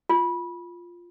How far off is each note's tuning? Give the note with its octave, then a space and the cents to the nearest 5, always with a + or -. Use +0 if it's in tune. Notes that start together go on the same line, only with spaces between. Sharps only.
F4 +0